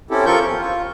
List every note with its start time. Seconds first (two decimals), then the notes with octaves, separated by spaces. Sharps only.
0.11 C4 C#4 E4 G4 A4
0.26 F3 F4 A4 A#4 C#6 G6
0.45 E2
0.59 F4